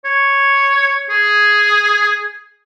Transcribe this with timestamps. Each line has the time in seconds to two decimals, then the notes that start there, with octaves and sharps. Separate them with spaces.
0.05 C#5
1.09 G#4